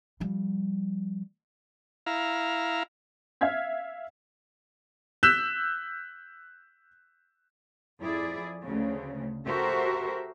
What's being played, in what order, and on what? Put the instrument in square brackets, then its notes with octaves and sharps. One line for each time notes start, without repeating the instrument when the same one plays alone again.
[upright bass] F3 G3
[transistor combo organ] E4 F5 A#5
[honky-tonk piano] E5 F5 F6 G#6 B6
[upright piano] E6 F#6 G6 B6 E7
[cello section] F2 E4 G#4 D5
D2 C#3
F#4 G4 A4 A#4 C5 E5